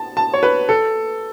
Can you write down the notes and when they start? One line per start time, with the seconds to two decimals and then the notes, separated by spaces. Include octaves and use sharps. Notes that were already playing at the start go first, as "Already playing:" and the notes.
Already playing: A5
0.17 A5
0.33 C#5
0.43 B4
0.69 A4